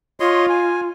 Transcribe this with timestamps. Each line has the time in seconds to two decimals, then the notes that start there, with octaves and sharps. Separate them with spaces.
0.20 F4 C#5 D#5 C6
0.49 G#5